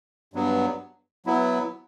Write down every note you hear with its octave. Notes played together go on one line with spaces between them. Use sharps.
G2 F#3 B3
F#3 B3 E4